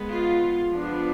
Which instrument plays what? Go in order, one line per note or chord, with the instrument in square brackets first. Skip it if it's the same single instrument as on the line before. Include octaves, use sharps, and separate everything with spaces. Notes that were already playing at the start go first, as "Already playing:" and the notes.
Already playing: [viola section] G#3 B3
F4
F3 B3 D4